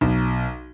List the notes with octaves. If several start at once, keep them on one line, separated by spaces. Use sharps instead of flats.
B1